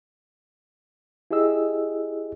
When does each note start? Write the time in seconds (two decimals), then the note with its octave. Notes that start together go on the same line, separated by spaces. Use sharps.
1.31 E4 G4 G#4 D#5 E6